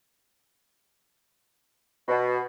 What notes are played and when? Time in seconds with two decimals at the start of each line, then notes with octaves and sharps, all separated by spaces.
2.08 B2